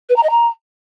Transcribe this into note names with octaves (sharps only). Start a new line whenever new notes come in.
B4
A#5
D#5
A#5